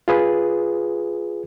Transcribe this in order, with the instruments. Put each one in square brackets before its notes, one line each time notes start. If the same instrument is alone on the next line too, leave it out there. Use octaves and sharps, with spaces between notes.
[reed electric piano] F4 G#4 B4